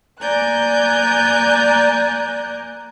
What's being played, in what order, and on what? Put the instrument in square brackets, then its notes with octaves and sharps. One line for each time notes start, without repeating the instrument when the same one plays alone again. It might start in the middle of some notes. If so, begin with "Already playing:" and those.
[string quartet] A#3 D5 G#5 A#5 F#6 G6